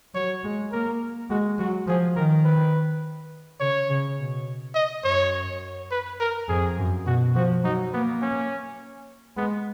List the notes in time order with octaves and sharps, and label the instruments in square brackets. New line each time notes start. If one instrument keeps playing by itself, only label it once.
[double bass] F#3 [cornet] C#5
[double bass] G#3
[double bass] A#3 [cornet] A#4
[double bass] G#3 [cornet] F#4
[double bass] F#3 [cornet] F#4
[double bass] F3 [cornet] G#4
[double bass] D#3 [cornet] A#4
[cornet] B4
[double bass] C#3 [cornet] C#5
[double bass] C#3
B2
[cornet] D#5
[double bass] F#2 [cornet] C#5
[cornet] B4
A#4
[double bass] F2 [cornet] G#4
[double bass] F#2
[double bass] B2 [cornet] F#4
[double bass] F3 [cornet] F#4
[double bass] F#3 [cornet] D#4
[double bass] A#3 [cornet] B3
[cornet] C#4
[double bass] G#3 [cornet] B3